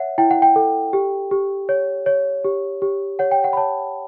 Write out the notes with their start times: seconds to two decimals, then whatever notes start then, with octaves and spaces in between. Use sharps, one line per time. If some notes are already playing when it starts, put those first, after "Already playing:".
Already playing: C#5 E5 F#5
0.18 E4 G5
0.31 F#5
0.42 G5
0.56 A4
0.93 G4
1.31 G4
1.69 C#5
2.06 C#5
2.44 G4
2.82 G4
3.19 C#5 F#5
3.31 G5
3.44 F#5
3.53 B5
3.57 C#5 A5